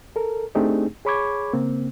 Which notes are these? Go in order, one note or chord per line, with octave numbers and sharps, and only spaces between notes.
A4 A#4
A3 C4 D4 D#4 G4 G#4
G#4 C#5 B5 C#6 D6 G#6
C#3 A#3 C4